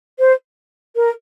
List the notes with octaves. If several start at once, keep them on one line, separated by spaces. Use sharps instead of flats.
C5
A#4